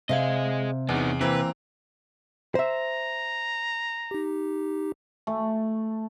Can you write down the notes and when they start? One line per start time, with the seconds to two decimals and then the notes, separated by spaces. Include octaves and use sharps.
0.09 C3 G#4 D#5 F5
0.89 E2 B3 D#4
1.21 E3 A#3 C4 B4
2.55 C5 E5 A#5
4.11 D#4 G4
5.27 A3